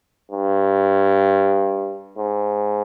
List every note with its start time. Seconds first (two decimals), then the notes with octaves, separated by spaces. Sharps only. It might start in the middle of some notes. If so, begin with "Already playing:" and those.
0.31 G2
2.18 G#2